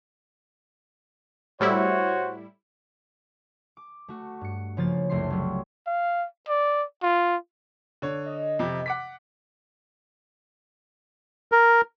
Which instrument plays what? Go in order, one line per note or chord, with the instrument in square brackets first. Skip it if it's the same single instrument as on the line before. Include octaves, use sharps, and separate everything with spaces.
[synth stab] A2 G3 E4 [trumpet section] F#4 C5 C#5
[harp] D6
A3 F#4
G2 C#7
C#3 F3 A#3 A6
F#1 C2 A3 C6 C7
F#3 G3
[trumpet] F5
D5
F4
[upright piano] D3 C#5
[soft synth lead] D#5
[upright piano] F2 C3
F#5 D6 B6
[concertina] A#4